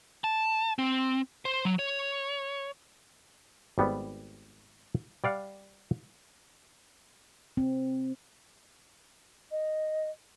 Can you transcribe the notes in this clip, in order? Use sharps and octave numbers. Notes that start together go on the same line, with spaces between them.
A5
C4
C5
F#3
C#5
G#1 G3 B3
G3 D5 F5 F#5
C4
D#5